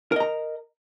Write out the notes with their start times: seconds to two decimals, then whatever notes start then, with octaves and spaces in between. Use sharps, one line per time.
0.12 A#4
0.16 D#5
0.20 A#5